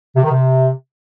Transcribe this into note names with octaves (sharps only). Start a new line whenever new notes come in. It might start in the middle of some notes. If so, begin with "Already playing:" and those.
C3
D#3
C3